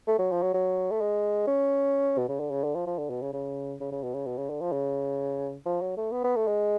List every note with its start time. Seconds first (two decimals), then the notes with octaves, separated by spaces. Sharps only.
0.08 A3
0.19 F#3
0.31 F3
0.42 F#3
0.54 F#3
0.91 A3
1.01 G#3
1.47 C#4
2.18 B2
2.29 C#3
2.40 D3
2.51 C#3
2.64 D3
2.75 F3
2.87 F3
2.98 D3
3.10 B2
3.22 C#3
3.33 C#3
3.80 C#3
3.92 C#3
4.03 B2
4.14 C#3
4.26 B2
4.38 C#3
4.49 D3
4.61 F3
4.72 C#3
5.66 F3
5.81 F#3
5.97 A3
6.12 B3
6.24 B3
6.36 A3
6.47 G#3